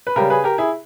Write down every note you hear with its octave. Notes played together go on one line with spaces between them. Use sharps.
B4
C#3 G3 G4 A#4
G#4 B4
G4 A#4
E4 G#4